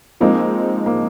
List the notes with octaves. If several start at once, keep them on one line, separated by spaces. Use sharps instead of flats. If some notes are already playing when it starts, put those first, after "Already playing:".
F3 G#3 A#3 C4 D#4
A#3